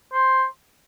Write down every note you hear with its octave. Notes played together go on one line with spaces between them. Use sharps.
C5